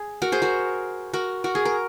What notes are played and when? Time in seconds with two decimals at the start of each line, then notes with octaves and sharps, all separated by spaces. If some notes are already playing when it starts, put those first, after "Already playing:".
Already playing: G#4
0.22 F#4 A#4
0.32 G#4 C5
0.42 F#4 A#4
1.13 F#4 A#4
1.44 F#4 A#4
1.55 G#4
1.65 A#4